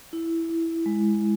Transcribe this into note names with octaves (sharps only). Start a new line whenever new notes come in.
E4
E4
G#3